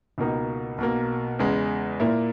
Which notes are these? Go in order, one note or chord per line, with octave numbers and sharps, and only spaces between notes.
C#2 B2 A#3 D#4
B1 B2 A#3
E2 C#3 G#3
A#2 A#3 E4